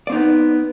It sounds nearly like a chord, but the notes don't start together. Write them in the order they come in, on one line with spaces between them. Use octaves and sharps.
D5 C4 D#4 B3